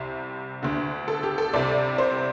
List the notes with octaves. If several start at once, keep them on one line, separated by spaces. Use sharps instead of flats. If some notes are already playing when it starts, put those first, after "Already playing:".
Already playing: C2 C3 C5
D2 D3
A4
G4
A4
C2 C3 D5
C5